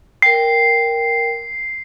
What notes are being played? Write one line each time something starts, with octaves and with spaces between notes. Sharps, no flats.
A#4 G5 C7